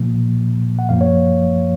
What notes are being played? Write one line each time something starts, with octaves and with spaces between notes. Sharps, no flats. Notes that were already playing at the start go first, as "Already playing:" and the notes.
Already playing: A#2 F3 A#3
F#5
F#2 F3 A#3 F5
C#5